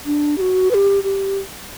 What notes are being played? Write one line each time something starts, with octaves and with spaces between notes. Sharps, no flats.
D4
G4
F#4
B4
G4
G4